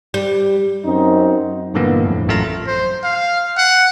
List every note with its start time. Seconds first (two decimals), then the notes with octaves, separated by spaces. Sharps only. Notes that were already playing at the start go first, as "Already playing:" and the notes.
0.14 G3
0.85 F#2 C4 D#4
1.74 G2 A#2 D3 E3 A#3 B3
2.05 F2 A2
2.27 A1 F#2 A3 F4 F5 A#5
2.67 C5
3.03 F5
3.57 F#5